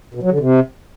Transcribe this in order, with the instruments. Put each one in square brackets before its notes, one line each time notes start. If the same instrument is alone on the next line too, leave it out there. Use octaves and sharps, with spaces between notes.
[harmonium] B2
F#3
D3
C3